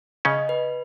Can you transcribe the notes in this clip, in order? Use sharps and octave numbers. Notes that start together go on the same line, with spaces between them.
C#3 C#4 D#5
B4